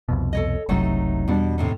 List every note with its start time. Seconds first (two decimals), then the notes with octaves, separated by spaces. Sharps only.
0.09 C2 F2 B2
0.33 A4 C#5 D#5
0.69 F#1 C2 C3 F#3 A3 D#4
1.28 E2 B2 G3 B3 D4
1.58 A2 C3 D#3